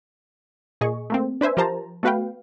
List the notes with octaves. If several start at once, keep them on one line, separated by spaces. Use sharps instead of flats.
A#2 G#4 D#5 C#6
A3 A#3 C4
D4 B4 C5 E5 G#5
F3 G4 A#4 C5 A5 A#5
A3 B3 F#4 B4 F5 G5